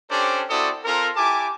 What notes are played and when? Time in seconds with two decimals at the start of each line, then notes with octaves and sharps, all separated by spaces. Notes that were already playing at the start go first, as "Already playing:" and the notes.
0.10 C#4 D4 G4 A4 C5 D5
0.50 C4 E4 F#4 A4 D5 D#6
0.85 C4 F4 A4 A#4
1.16 E4 G4 G#5 A5 D6